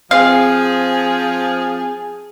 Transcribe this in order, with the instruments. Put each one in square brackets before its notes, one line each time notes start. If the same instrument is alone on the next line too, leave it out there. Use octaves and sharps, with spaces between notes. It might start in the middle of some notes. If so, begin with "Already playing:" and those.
[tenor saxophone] F3 [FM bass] C4 [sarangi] G#4 [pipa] F5